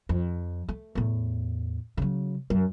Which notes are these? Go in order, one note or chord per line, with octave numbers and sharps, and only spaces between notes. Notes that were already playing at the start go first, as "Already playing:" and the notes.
F2
A3
E2 A2
C#3 F#3
F#2